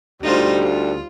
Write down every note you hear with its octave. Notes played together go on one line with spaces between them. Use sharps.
D2 G3 D#4 F4 C5
F4